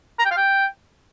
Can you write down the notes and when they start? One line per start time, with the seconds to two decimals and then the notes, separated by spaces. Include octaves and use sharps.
0.19 A#5
0.25 G5
0.31 F5
0.37 G5